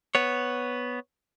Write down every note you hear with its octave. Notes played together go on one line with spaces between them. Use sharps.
B3 C#5